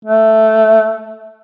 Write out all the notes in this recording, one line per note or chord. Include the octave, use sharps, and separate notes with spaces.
A3